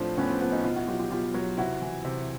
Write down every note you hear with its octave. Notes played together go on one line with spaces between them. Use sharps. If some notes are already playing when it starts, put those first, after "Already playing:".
Already playing: A2 F3 C4 D4
A2 B3 C#4
C4
F3 B3
C#4 D#4
B2 D#4 F4
E4 F#4
F#3 F4 G4
F4 G4
B2 F4 G4
F#3
C3 E4 F#4
E3
C3